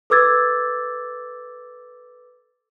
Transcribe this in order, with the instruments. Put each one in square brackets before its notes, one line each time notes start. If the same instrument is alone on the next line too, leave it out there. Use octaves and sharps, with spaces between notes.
[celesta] A4 B4 D6 E6 G#6 A6